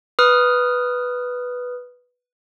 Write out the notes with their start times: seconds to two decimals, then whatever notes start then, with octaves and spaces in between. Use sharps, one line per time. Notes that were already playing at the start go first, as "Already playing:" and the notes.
0.19 B4 D#6 F6